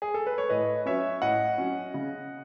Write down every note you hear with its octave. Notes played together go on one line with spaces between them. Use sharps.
G#4
A4
B4
C#5
A2 B4 D#5
F#3 C#4 C#5 E5
A2 D#5 F#5
F#3 C#4
C#3